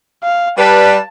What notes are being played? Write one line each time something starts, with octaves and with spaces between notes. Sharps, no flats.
F5
G3 B4 A5